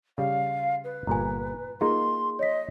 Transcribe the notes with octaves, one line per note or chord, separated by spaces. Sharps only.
C#3 G3 F5
B4
G1 A#2 G#5 A#5
A#3 D#4 F4 G#4 C6
C#5 D#5 B6